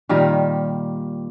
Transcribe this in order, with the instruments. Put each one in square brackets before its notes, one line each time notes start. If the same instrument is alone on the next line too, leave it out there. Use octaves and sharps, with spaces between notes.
[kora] A#2 D#3 G3 A#4